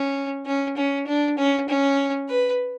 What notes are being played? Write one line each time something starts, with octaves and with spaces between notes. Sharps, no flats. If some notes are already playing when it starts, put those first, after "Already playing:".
Already playing: C#4
C#4
C#4
D4
C#4
C#4
B4